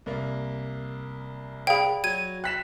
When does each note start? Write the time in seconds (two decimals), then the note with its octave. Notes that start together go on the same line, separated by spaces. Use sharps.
0.06 C2 A#3
1.67 G#4 D5 F5 G5 B5
2.04 F#3 G#6 D#7
2.44 G5 F#6 B6 E7